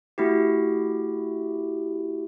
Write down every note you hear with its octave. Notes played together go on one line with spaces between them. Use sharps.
A3 E4 F#4 G4